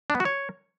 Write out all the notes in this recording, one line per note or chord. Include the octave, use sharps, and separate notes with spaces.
D4
B3
F#4
C#5